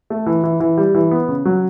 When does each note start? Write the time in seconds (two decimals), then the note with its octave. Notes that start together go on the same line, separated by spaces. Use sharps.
0.10 A3
0.26 E3
0.44 E3
0.60 E3
0.77 G3
0.95 E3
1.11 B3
1.28 C#3
1.45 F#3